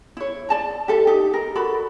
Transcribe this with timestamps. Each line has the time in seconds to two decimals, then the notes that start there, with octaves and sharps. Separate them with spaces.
0.17 E4 C#5
0.49 D5 A5 A#5
0.88 G4 A4 E5
1.07 D#4 G4
1.34 A#4
1.55 F#4 A4 D5 B5